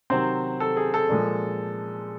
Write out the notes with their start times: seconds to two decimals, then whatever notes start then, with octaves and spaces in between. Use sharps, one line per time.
0.10 C3 D#3 F#3 C4 C5
0.60 A4
0.76 G#4
0.94 A4
1.09 A#2 F3 G#3